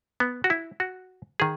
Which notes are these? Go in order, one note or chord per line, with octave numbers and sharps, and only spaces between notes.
B3
F#4
E4
F#4
D#3 G#4